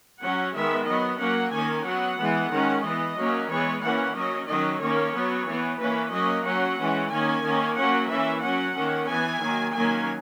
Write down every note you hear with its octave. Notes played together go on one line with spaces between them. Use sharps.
F#3 C#4 F#5
D#3 G#3 B3 E5
F#3 B3 D#5
F#3 A#3 C#4 F#5
D#3 A#3 C#4 G#5
F#3 B3 F#5
E3 G#3 B3
D#3 G#3 C#4
E3 B3 D#5
F#3 A#3 C#4
E3 G#3 B3 C#5
E3 A#3 C#4 F#5
F#3 C#4 D#5
D#3 F#3 C#4 D#5
D#3 A#3 C#4 C#5
F#3 B3
E3 B3
E3 A#3 C#4 B4
F#3 A#3 C#4 D#5
F#3 C#4 F#5
E3 G#3 C#4
D#3 A#3 C#4 G#5
D#3 A#3 C#4
F#3 A#3 C#4 F#5
E3 A#3 C#4 E5
F#3 C#4 F#5
D#3 A#3 C#4
E3 B3 G#5
D#3 F#3 A#3
D#3 F#3 A#3 C#4 G#5